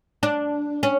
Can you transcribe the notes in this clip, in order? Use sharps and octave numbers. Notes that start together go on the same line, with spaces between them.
D4
C#4